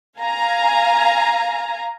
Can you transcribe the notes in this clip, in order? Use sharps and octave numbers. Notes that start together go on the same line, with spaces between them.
F5 G#5 A#5